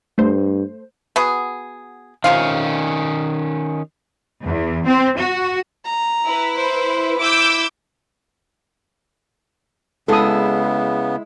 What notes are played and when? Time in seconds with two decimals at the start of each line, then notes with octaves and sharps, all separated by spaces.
0.18 G2 A3 C5
1.16 B3 F#4 G#4
2.24 C3 D#3 C#4 F4 F5
4.44 E2
4.87 C4
5.19 F#4
5.85 A#5
6.25 E4 B4
6.55 C5
7.19 E4 D6 E6 G6
10.08 C#3 G#3 B3 E4 A4 D#6